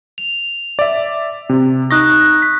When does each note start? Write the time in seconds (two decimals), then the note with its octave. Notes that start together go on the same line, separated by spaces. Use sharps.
0.18 F7
0.79 D5 E5
1.49 C3
1.91 D#4 C#6 D#6 F#6 A#6
2.42 B6